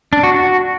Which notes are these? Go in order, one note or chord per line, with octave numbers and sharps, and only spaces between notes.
D4
F#4
F#4